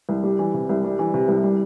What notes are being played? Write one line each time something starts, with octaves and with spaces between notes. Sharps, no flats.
C2
G3
E3
C3
C2
G3
E3
C3
C2
G3